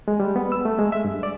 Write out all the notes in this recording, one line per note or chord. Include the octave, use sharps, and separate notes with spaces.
G#3
G3
B3
E6
A3
G#3
E5
G2
D5